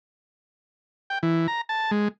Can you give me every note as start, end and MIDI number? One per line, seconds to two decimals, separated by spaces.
1.10 1.18 79
1.23 1.47 52
1.48 1.61 82
1.69 1.91 81
1.91 2.08 56